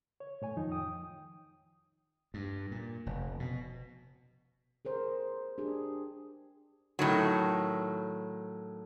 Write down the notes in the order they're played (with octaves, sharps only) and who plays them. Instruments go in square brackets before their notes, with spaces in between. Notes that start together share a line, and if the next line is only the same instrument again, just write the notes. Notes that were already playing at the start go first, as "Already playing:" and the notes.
[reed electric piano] C#5
A2 C#5 G#5
F2 D#3 F3 D#4
G5 D#6
[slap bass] G2
A#2
F1
B2
[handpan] G#4 A#4 C5
D4 G4 G#4
[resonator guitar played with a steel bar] A2 D#3 F#3